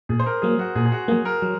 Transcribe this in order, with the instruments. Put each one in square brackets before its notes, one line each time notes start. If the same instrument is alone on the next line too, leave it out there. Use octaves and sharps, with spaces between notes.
[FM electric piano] A#2 [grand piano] G#4
[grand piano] C5
A#4
[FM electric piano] F#3 A#3 [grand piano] G#4
[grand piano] F#4
[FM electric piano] A#2 [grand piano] G#4
[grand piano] G#4
F#4
[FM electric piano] F#3 A#3 [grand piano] G#4
[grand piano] A#4
[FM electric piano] F#3